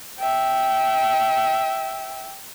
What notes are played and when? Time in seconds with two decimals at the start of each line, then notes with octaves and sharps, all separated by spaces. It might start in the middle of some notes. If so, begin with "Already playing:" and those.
0.19 E5 G5